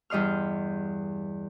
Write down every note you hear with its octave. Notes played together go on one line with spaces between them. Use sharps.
E2 G2 D#5 C6 F6